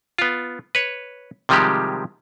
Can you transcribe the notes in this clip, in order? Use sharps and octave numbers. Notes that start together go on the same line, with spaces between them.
B3 F4
B4 C#5
C3 D#3 F3 G3 G#3 G4